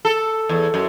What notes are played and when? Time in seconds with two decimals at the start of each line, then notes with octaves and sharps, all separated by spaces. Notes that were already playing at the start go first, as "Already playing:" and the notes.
0.05 A4
0.49 E2
0.74 F#2